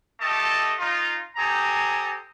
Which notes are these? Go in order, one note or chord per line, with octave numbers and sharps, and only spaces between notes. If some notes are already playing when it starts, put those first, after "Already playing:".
A3 G4 A4 D#5 A5
D#4 F4
G4 A4 C5 G#5 A#5 D#6